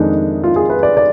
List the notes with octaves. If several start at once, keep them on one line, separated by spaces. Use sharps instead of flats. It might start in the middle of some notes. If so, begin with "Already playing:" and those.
Already playing: F2 D#3 G#3 D4 D#4
F4
G#4
B4
D5
D5